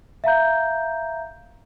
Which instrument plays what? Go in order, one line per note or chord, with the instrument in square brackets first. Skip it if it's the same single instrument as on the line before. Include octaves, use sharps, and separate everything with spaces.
[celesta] E5 F5 A#5 G6